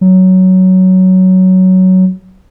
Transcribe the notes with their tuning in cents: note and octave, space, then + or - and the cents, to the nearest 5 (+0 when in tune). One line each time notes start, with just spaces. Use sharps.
F#3 +10